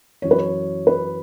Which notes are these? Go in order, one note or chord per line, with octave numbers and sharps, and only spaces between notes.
F#2 E3 C#5
B4
C#5
B4